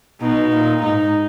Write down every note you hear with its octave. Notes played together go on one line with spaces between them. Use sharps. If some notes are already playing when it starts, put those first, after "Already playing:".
B2 D#4
A#2
G#2 D#4